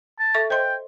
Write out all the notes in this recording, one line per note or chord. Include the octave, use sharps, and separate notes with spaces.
A5
A4 E5 C#6
C5 D#5 G5 C6